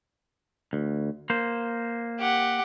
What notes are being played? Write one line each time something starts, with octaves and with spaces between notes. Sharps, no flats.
D2
A#3 C5
G4 F#5